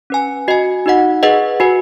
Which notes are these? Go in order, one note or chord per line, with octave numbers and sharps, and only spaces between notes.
C#4 B4 G#5
F#4 D#5 G#5
D#4 F#4 D#5 F#5
G#4 B4 D#5 F#5
F#4 B4 G#5